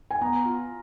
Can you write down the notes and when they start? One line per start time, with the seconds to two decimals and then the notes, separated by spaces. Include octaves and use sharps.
0.11 G#5
0.21 B3 A#5
0.46 F4